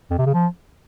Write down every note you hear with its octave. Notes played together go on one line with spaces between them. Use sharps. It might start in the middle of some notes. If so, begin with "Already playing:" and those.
F2
C3
C#3
F3